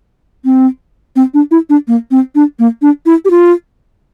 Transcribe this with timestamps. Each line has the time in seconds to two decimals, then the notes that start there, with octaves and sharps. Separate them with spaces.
0.45 C4
1.16 C4
1.34 D4
1.51 E4
1.70 D4
1.88 A#3
2.11 C4
2.35 D4
2.59 A#3
2.82 D4
3.06 E4
3.25 G4
3.31 F4